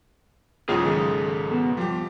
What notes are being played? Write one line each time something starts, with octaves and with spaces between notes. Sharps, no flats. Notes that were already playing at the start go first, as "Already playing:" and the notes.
B1 G#2 C#3 F4 G#4
D#3 G#4 A4
B2
F2 G3 G4